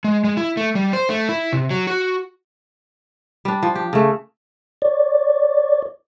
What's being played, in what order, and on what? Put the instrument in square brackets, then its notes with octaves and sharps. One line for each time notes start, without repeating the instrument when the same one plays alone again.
[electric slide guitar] G#3
G#3
E4
A3
G3
C5
A3
E4
C3
F#3
F#4
[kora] G3 D4
F3
G4
C#3 A3
[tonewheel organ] C#5 D5